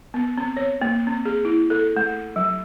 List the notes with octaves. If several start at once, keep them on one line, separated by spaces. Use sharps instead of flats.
B3
C4
C#5
A#3
C4
G#4
E4
A4
A3
F#3